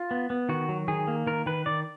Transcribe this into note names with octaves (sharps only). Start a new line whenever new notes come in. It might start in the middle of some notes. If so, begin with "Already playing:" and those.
Already playing: F4
B3
B3
D#3 F#4
F#3
D#3 G#4
A#3
D#3 A#4
D#3 B4
D#3 D5